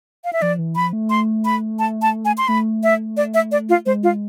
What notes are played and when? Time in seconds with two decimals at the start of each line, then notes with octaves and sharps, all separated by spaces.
0.24 F5
0.33 E5
0.42 F3 D5
0.59 E3
0.76 F3 B5
0.93 A3
1.10 C6
1.45 B5
1.79 A5
2.02 A5
2.25 G#5
2.38 C6
2.48 A3 B5
2.83 E5
3.17 D5
3.34 E5
3.52 D5
3.69 F4
3.86 G#3 C5
4.03 F4